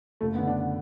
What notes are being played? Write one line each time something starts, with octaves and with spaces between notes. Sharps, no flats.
F#1 A3
B3
D3
D4